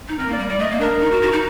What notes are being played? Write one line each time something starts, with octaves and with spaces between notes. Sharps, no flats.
D#4
C4 A#4
A#3
D5
G3
G3 D5
A3 D#5
A#3
D4 A#4
D#4
F#4
F#4
D#4